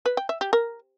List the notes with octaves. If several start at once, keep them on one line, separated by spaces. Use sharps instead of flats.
B4
G5
E5
G4
A#4